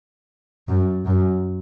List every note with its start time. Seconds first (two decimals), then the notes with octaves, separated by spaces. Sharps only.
0.68 F#2
1.06 F#2